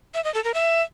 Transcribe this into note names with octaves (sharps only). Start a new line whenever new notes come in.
E5
D#5
A4
A#4
E5